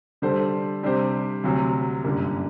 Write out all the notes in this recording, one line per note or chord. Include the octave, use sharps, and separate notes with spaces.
D3 G3 D4 A4 C5
C3 G3 D4 G4 C5
D2 C3 F#3
G1 F#2 D3 G3 A#3